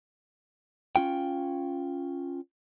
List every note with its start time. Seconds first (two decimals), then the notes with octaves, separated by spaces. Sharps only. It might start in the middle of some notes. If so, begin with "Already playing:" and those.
0.96 C#4 F4 G5